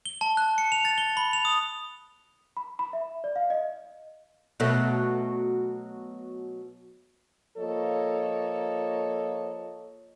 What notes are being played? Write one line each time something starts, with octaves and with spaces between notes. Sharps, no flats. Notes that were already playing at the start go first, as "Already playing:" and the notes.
G7
A5
F#6
C#7
F7
A6
G7
B5
F7
D#6
B5
B5
E5
D5
F5
D#5
B2 F#3 A3
F3 A#3 A4 C#5 D#5